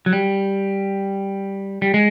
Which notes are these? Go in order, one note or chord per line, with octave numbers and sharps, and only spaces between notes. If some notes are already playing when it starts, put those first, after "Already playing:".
F#3
G3
G3
G#3